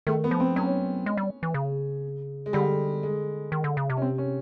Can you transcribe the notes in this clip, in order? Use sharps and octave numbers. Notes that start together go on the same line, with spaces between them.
D#3 A3
B3
F3
C4
F#3 C#4
G#3
G3
E3
C#3
G#3
D3 G3
G#3
D#3
D3
C#3
C3
C#4
C4
C#4